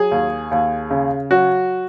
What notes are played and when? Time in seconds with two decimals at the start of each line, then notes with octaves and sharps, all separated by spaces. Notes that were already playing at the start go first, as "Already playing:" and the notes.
Already playing: F#3 G#4
0.11 D#2
0.51 D#2
0.90 C#3
1.31 F#3 F#4